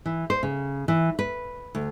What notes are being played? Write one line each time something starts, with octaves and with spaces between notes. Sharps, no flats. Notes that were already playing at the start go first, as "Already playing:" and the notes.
E3
C5
C#3
E3
B4
D2